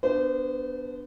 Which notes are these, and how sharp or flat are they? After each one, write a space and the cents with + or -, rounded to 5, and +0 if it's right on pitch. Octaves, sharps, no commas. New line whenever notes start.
B3 +0 D4 +0 C5 -30